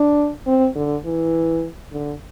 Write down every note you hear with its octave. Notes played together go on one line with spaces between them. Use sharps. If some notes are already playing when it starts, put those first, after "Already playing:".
Already playing: D4
C4
D3
E3
D3